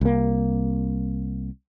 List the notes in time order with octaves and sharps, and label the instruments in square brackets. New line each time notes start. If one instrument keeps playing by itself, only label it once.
[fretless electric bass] C2 A#3